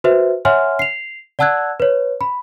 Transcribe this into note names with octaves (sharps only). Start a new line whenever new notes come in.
F#4 B4 C5 E5
C#5 E5 F#5 G#5 C6 F6
C7 F7
D5 F#5 A5 E6 F#6 G#6
B4 C#5
B5